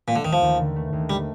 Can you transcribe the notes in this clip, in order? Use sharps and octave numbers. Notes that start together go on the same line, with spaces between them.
A#2 A3
D3
D#2 D#3
F3
D#2
D3
A3
D#2
G3 A3